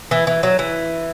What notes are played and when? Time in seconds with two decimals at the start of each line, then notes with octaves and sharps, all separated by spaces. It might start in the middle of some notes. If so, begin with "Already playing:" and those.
0.11 E3
0.27 E3
0.43 F#3
0.59 E3